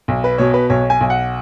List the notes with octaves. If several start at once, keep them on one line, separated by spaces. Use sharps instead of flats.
B1
B4
B2 C#5
B4
B1 C#5
G#5
B1
F#5